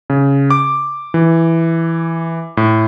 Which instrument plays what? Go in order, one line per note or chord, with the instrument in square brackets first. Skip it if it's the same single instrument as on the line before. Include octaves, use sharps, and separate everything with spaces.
[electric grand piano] C#3
D6
E3
A2